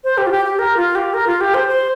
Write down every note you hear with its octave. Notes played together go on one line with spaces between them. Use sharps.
C5
G4
F4
G4
G4
A#4
F4
G4
A#4
F4
G4
C5
C5